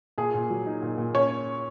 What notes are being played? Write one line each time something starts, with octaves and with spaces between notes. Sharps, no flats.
A#2 G#4
A#2
F#3
D#4
A#2
A#2
C#4 C#5